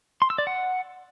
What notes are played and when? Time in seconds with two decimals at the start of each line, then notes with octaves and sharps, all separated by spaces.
0.22 C6
0.30 E6
0.38 D5
0.47 F#5